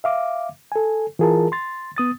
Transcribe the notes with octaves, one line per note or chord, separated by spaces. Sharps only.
E5 F5 D6
A4 G#5
E3 F4 G#4 A#4 A5
C6 A6
B3 D#6 A6